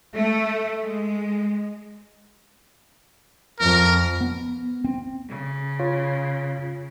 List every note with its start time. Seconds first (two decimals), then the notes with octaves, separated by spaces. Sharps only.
0.15 A3
0.83 G#3
3.60 F2 A#4
4.21 B3
4.84 C4
5.27 C#3
5.79 F4 C#5 F5